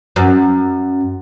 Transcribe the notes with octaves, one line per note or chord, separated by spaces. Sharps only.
F#2